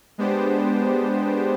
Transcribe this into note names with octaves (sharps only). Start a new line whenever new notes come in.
G#3 B3 D4 G4 C5